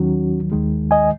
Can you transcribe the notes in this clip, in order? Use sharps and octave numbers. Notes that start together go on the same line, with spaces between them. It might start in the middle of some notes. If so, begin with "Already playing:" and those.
Already playing: D#2 D#3 F#3 C#4 F#4
D#2 D#3 G#3
D#5 G#5